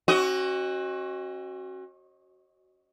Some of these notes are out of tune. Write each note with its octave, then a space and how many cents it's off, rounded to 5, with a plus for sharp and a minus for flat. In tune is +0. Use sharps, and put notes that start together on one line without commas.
C#4 -45 F#4 +15 D#5 +0